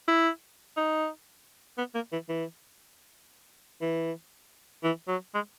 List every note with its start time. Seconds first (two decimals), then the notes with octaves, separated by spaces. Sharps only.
0.08 E4
0.77 D#4
1.78 B3
1.95 A#3
2.12 E3
2.29 E3
3.81 E3
4.83 E3
5.08 F#3
5.34 G#3